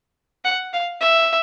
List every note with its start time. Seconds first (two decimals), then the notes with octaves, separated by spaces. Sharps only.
0.45 F#5
0.73 F5
1.01 E5